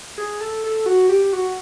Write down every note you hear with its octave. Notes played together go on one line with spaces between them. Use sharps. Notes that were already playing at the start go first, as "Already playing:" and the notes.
G#4
A4
A4
F#4
G4
F#4